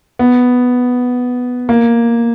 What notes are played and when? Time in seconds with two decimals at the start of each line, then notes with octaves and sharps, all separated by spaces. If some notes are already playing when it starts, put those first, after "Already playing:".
0.19 B3
1.69 A#3